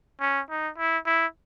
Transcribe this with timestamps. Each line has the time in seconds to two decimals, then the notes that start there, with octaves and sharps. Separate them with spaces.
0.21 C#4
0.50 D#4
0.78 E4
1.06 E4